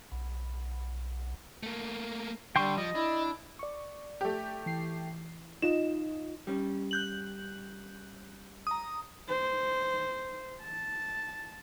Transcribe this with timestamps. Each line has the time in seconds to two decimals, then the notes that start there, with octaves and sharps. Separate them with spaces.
0.12 B1
1.63 A3 A#3
2.56 D3 G3 G5 C6 C#6
2.78 F3 D#5
2.95 D4 E4
3.59 D5 C#6
4.21 A3 G4
4.66 E3 C7
5.62 D#4 F4 D#5 E7
6.47 G3 C#4
6.91 F#6 G6 F#7
8.67 A#5 D#6
9.28 C5
10.62 A5